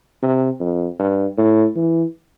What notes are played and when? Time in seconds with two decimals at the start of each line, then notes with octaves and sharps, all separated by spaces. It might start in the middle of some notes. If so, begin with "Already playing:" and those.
0.23 C3
0.60 F2
1.00 G2
1.38 A2
1.76 E3